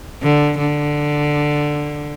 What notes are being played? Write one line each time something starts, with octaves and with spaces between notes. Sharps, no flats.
D3
D3